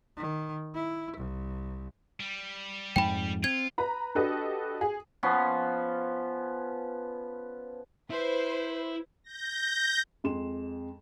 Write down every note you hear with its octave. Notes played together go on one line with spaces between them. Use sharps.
D#3
E4
C2
G3
F2 G#2 G5 B5
C4 F4 G#6
B4 A#5 B5
D4 F#4 G4 A4 B4 D#5
G#4
F3 B3 C#4 C6
E4 B4 C5
G6 A#6
F2 G#3 C6 E7